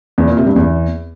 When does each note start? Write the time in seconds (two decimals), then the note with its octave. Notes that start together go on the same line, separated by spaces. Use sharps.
0.18 E2
0.27 A#2
0.37 C3
0.46 G2
0.56 E2